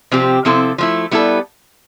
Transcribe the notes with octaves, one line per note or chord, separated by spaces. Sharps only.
C3 F3 C4 G4
C3 F3 C4 E4 A4
F3 A3 E4
G3 B3 E4 A4